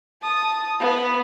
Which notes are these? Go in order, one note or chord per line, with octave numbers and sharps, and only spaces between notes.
A5 D#6
B3